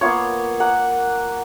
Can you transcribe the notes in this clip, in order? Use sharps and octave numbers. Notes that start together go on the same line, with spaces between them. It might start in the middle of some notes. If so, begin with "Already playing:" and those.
A#3 B3 F4 C#5
A#4 F#5 D6